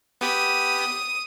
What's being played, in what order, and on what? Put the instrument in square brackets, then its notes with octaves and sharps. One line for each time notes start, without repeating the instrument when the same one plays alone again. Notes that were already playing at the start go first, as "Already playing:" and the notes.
[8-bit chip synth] B3 G4 B5 [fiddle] D#6